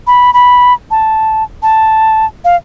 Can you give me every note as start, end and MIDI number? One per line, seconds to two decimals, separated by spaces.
0.07 0.33 83
0.34 0.73 83
0.91 1.43 81
1.63 2.26 81
2.45 2.56 77